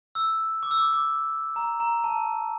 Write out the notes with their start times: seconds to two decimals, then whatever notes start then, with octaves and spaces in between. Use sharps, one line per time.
0.15 E6
0.63 D6
0.71 E6
0.77 D6
0.93 D6
1.56 A#5
1.80 A#5
2.04 A5